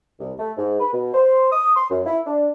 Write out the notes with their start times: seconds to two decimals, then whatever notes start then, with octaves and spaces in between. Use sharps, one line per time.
0.20 C2
0.39 A3
0.57 G#2
0.80 B4
0.93 B2
1.14 C5
1.51 D#6
1.76 C6
1.90 F#2
2.06 E4
2.26 D4